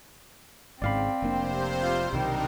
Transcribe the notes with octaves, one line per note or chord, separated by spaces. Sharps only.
G#1 G#2 C#3 C4 D5 F5 B5
F1 C3 A#3 D4 C5
F4
B1 C3 D#3 G3 D4 D#4 A#4